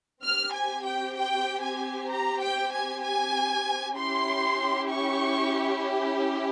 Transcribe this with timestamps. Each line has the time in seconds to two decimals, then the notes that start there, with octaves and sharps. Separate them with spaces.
0.23 C4 G4 F6
0.54 G#5
0.85 G5
1.16 G5
1.63 G#5
2.10 A#5
2.41 G5
2.73 G#5
3.03 G#5
3.96 C#4 E4 G4 C6
4.91 C#6